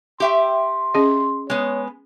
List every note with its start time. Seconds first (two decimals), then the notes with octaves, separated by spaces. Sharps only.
0.20 G4 E5 G5 C6
0.94 C#4 G#4 D#5
1.50 G#3 B3 C#5